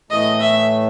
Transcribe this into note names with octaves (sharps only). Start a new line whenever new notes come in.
A2 E3 A3 D#5
E5